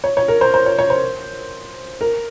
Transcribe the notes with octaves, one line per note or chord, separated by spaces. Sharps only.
C#5
C#5
A#4
C5
C5
C#5
C#5
C5
A#4